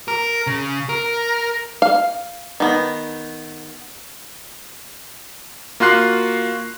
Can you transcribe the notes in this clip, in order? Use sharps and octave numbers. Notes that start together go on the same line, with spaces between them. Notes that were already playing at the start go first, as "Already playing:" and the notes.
A#4
C#3
A#4
F5
D#3 B3
A#3 F4 F#4 C6 F#6 C7